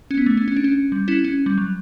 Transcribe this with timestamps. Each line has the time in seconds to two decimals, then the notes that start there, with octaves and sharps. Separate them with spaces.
0.11 C#4
0.17 B3
0.26 A3
0.37 C#4
0.48 C#4
0.56 D4
0.64 C#4
0.92 G3
1.08 C#4 E4
1.24 C#4
1.46 G3
1.58 F#3